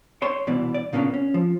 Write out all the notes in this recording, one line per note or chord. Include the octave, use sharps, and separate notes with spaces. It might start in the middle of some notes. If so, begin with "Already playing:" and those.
C#5 C6
C2 B2 E3 D5
D5
A#2 C#3 A#3 B3 C#4 D4
C#4
F3